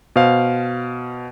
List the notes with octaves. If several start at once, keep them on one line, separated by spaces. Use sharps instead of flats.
B2 C5 F5